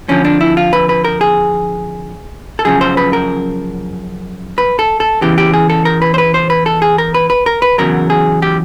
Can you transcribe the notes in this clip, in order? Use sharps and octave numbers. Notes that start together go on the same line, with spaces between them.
F2 D3 F3 C#4
D4
E4
F4
B4
B4
A#4
G#4
A4
F#2 C#3 F3 G#4
C5
B4
A#4
B4
A4
A4
E2 C#3 E3 G4
G4
G#4
A4
A#4
B4
C5
B4
C5
B4
A4
G#4
A#4
B4
B4
A#4
B4
E2 C#3 F#3 A#4
G#4
G4